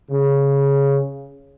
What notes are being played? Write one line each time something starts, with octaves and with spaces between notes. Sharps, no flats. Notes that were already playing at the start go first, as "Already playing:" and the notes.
C#3